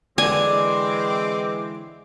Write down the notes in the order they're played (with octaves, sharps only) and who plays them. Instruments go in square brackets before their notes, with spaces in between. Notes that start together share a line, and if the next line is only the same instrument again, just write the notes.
[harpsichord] D3 D4 [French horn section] E3 G#3 [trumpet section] C4 D6 [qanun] G#5